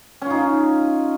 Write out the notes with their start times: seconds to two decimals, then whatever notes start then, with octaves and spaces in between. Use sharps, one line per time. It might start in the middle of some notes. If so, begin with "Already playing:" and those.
0.22 C#4
0.26 F4
0.31 D#4
0.35 F5